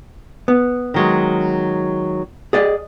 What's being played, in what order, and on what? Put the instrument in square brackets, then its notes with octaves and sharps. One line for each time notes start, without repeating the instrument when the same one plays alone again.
[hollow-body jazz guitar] B3
[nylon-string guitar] D#3 F#3 G#3
[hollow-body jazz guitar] G#4 D5 D#5